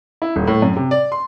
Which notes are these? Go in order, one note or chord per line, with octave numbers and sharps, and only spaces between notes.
E4
D#1
A2
F#2
C3
D5
C6